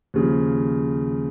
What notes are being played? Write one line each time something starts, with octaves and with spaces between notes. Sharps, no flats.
D#2 C#3 F3